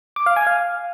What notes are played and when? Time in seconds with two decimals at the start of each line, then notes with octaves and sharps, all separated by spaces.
0.16 D6
0.26 F5
0.36 G#5
0.47 F5